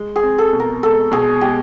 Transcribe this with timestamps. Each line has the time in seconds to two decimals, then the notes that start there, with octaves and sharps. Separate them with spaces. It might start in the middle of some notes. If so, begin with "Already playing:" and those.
Already playing: G#3
0.16 G#4
0.23 C4
0.38 A4
0.53 B2
0.60 A#4
0.83 G#3 A4
1.12 B2 G#4
1.41 G#3 G4